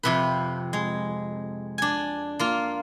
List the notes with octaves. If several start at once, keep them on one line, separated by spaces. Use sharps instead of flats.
F2 C3 B4
G#3
D4 G#5
A#3 F4